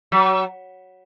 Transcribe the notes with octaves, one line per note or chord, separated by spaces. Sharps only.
F#3